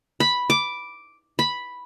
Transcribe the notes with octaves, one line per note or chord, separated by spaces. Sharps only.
B5
D6
B5